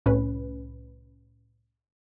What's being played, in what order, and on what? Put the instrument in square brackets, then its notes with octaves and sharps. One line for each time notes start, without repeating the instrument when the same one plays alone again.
[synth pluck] C2 A2 C#4 B4